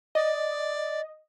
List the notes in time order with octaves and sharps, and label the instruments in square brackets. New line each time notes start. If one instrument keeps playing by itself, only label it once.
[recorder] D5 [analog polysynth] D#5